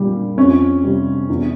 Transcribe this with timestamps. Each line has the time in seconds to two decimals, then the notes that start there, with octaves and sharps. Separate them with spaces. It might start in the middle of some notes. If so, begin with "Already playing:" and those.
Already playing: A#2 G3
0.37 F2 C#4
0.84 C3 G3
1.29 E2